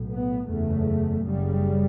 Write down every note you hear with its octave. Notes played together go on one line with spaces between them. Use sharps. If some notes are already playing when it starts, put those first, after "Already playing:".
Already playing: B1 A2
B3
F#1 E2 C#3 A3
F#1 F#2 C#3 G3